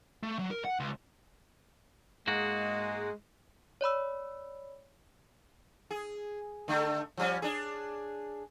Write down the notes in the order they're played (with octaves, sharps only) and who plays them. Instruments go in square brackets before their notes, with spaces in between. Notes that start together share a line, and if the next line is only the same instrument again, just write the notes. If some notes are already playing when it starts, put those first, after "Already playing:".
[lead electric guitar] A3
F#3
A#4
F#5
C#2
[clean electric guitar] G#2 A#3 F#4 [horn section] G#3
[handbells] C#5 D5 B5 E6
[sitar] G#4
D3 A3
F3 G3 C#4
D4 G#4